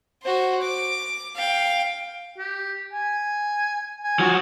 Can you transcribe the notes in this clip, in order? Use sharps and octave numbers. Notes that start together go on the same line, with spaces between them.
F#4 C5
D6
F5 G5
G4
G#5
G#5
F3 F#4